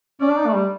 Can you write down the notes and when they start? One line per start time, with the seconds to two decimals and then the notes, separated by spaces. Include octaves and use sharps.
0.21 C#4 D5
0.30 D4
0.38 D#4
0.47 A3
0.55 G3